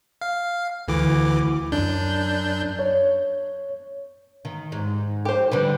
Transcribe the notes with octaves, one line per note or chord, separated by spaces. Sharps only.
F5
D2 E3 D6
F#2 D4 G6
C#5
D#3
G#2
G4 C5
D3 G3 D4 B4